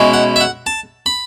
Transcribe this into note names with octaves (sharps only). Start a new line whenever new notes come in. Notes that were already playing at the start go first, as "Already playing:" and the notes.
Already playing: B2 G#3 C#4 E4
F#5
E5
F#5
A5
B5